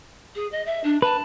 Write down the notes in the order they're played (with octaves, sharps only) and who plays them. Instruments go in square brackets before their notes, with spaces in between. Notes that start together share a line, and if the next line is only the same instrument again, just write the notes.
[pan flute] G#4
D#5
E5
D4
[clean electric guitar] B4 [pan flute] A5